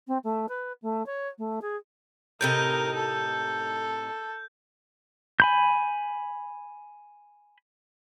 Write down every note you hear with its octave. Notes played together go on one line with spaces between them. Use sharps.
C4
A3
B4
A3
C#5
A3
G#4
A2 C3 D#4 A#4 G6
A4
G#5 B5 G6